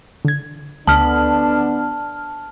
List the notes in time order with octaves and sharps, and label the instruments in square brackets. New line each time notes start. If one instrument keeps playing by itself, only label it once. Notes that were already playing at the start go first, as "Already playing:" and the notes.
[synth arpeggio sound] D3 G#6
[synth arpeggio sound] D2 [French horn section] D3 B3 D4 [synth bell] A5 F6